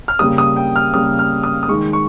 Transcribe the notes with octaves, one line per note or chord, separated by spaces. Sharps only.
F6
C#3 G3 A#3 D#6
D#6
G5
F6
C#3 G3 A#3 D#6
F6
D#6
D#6
D#3 G#3 C#6
C#6